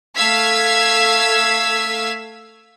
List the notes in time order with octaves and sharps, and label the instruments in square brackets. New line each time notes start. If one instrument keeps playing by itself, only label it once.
[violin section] A3 F5 E6 G#6 B6